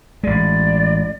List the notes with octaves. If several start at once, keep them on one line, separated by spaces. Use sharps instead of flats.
A1 G#3 D5